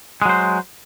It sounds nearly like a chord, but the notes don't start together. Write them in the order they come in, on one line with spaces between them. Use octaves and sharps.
G#3 F#3 C5